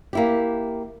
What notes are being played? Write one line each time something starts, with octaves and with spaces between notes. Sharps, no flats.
A#3 E4 G4